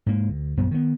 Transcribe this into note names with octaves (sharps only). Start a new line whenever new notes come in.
G#2 A#3
D2
A#1 F#2 F3 B3
D#3 B3